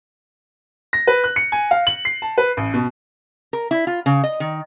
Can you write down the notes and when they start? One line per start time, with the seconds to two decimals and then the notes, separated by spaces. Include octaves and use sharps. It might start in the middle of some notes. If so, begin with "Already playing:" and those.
0.93 A#6
1.07 B4
1.24 F#6
1.36 C#7
1.52 G#5
1.71 F5
1.87 F#7
2.05 C7
2.22 A5
2.38 B4
2.57 A1
2.74 B2
3.53 A#4
3.71 E4
3.87 F4
4.06 C#3
4.24 D#5
4.40 D#3